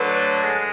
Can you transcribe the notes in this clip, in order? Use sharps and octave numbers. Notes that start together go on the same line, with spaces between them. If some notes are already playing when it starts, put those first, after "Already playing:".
Already playing: D3 F#3 A3 B4
G#3